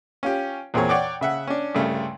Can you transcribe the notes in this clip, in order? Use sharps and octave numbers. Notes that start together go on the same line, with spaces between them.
C#4 F4 G4
E2 A#2 C4 G#4 C#5
C#5 D5 F#5 G5 D6
C#3 E5 F#5
C#4 D4
C2 G2 C#3 A3